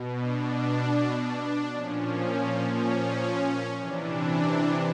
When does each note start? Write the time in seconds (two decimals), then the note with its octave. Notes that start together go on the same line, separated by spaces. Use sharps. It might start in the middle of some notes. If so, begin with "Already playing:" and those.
Already playing: B2
0.18 D4
1.22 D4
1.72 A#2 F3 C#4
2.75 C#4
3.78 C3 E3 D4